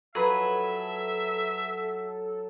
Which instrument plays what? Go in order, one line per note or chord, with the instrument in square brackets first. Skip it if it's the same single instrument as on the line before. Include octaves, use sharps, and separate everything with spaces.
[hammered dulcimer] F#3 [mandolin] G#4 B4 [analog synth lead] A4 [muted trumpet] E5